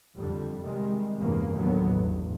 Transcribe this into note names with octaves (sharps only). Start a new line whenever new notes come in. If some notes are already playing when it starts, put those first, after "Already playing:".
F2 D3 G3
C3 D#3 G3 G#3
E2 G2 C3 A#3 C#4
D#2 A2 D3 F#3 B3
A1 E2 G2